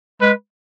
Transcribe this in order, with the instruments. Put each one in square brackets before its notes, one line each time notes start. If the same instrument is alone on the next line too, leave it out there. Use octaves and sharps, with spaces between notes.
[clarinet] G#3 [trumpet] B4